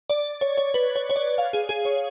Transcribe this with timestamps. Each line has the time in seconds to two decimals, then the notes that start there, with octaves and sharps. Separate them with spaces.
0.10 D5
0.41 C#5
0.58 C#5
0.74 B4
0.96 C#5
1.10 C#5
1.16 D5
1.38 F5
1.53 G#4
1.69 G#4
1.85 C#5